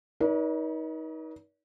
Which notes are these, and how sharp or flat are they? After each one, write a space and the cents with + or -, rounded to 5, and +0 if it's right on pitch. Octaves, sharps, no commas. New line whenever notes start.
D#4 +25 B4 -45 D5 -40